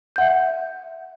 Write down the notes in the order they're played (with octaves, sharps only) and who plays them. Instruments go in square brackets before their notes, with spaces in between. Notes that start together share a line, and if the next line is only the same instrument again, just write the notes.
[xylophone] E5 F#5 G6